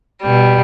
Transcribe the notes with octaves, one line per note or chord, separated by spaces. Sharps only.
B2 G3